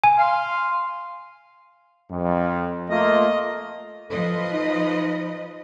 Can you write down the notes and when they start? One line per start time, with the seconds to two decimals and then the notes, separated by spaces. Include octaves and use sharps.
0.04 G#5
0.18 F5 C6
2.11 F2
2.90 A3 A#3 F4 D#5
4.10 F3 A4 B4 D#5
4.53 D#4